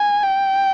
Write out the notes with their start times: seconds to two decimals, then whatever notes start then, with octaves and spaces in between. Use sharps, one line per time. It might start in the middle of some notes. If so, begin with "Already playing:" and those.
Already playing: G#5
0.23 G5